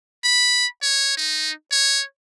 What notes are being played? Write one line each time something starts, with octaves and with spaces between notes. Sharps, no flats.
B5
C#5
D#4
C#5